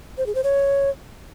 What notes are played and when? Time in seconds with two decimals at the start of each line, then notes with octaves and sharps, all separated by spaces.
0.18 C5
0.26 G#4
0.35 C5
0.44 C#5